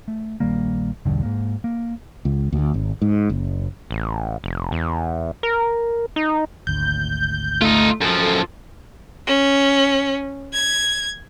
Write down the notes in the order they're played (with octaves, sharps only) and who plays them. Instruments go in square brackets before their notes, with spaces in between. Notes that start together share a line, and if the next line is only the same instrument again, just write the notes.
[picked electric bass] A3
A#1 D#3 G3 A#3
B1 E2 G2 D3
G#2 A#3
A#3
[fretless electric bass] C#2
D2
G#1
G#2
F#1
[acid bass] A1
F1
E2
A#4
D#4
[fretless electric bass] G#1 D2 [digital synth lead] G6
[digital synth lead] A3 [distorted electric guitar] D#4 F4
[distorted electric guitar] F#2 F3 [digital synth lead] A4
[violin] C#4
G#6